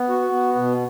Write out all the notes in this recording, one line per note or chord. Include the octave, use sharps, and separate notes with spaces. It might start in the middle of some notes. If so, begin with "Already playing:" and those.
Already playing: B3
F#4
B3
B2